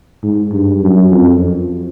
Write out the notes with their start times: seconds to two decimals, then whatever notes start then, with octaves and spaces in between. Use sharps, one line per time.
0.23 G#2
0.52 G2
0.81 F#2
1.11 F2